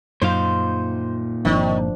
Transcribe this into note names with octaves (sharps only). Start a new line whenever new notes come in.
F#2 A#2 F#3 D#4 C5 F5
G1 D#3 F3 C4 D4